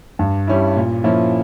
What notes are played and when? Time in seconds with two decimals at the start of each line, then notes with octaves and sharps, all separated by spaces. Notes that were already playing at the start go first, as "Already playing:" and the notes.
0.19 G2
0.47 G3 C#4 E4
0.76 A#2
1.04 F3 A#3 C#4 E4